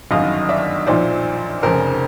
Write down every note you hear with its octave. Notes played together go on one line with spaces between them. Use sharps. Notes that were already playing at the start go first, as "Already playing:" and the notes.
G1 F#2 D#3 D#5 F5
D5 E5
B1 A#2 F3 C5 D5
F1 F2 C#3 A#4 C5